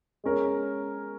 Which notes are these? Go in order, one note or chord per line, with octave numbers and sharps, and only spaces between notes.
G#3 C#4 A#4 C#5